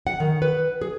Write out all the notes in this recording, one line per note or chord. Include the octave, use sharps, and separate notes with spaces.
F#5
D#3
B4
G#4